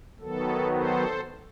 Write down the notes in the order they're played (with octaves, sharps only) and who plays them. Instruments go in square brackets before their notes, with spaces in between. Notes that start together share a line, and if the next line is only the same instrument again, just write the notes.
[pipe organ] D#3 F#3 B3 A4
A4 C5